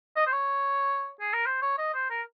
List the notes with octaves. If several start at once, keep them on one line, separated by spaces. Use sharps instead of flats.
D#5
C5
C#5
G#4
A#4
C5
C#5
D#5
C5
A#4